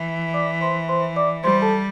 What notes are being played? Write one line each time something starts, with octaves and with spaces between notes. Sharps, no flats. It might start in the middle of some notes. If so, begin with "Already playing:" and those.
Already playing: E3
D5 D6
C5 C6
C5 C6
D5 D6
G3 C5 C6
A4 A5